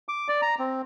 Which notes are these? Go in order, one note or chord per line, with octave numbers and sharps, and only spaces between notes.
D6
D5
A#5
C4